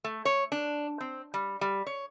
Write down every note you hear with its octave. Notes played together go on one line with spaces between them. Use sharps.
A3
C#5
D4
C4
G3
G3
C#5